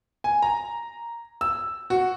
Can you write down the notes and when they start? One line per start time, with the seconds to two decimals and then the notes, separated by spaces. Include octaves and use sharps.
0.24 G#5
0.43 A#5
1.41 E6
1.90 F#4